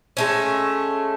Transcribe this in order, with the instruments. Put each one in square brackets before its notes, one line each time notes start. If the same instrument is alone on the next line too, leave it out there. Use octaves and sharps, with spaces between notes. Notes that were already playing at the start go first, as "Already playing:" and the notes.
[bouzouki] G#3 A3 C#4